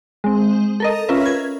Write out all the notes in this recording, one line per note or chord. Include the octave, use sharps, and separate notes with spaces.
G#3 C4
A4 A#4 D#5
C#4 F4 A#4 B4 E5
G#6